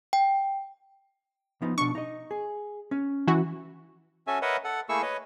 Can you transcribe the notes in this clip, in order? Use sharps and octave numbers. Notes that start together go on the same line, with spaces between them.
G5
F3 B3 D#4
B2 D4 C#6
D#4 D#5
G#4
C#4
E3 F#4
C#4 F#4 A4 E5 G#5
A#4 B4 C#5 D#5 E5 F#5
A4 F#5
A3 A#3 E4 G#4 C#6 E6
B4 C#5 D#5